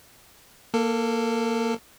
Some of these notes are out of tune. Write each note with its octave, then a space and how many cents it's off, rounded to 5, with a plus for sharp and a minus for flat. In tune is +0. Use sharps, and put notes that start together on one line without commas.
A#3 +0 A4 +20